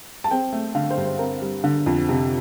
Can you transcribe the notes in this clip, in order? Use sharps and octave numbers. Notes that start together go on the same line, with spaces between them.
A5
C4 G5
A3
D3 F5
C5
G2
C5
C4 A#4
G3
D3
F2
C3